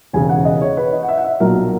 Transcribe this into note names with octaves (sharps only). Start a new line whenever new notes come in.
E1 D#2 C#3 G#5
F#5
D#5
C#5
B4
D#5
F#5
E5
F#5
E5
B1 A#2 F#3 A#4